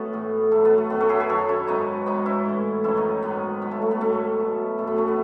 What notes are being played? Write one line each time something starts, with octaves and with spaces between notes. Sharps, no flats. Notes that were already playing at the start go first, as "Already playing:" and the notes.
Already playing: A3 B3 C#4 F#4
A2 E3
A2 F#3 A3
B3
A3
F#2 D#3 F#3 B3
A3 C#4
E4 G#4
G#4 B4
F#2 D#3 F#3 A4 C#5
C#4 E4
G#2 D#3 F#3 B3 D#4
G#2 E3 B3 D#4
C#4 E4
A2 E3
F#2 D#3 F#3 C#4 E4
B3 D#4
G#2 D#3 F#3 B3
B2 F#3 B3
A3
A3
B3
G#2 D#3 F#3 A3 C#4
A3
B2 F#3
F#2 E3 A3
B3
A3 C#4
B3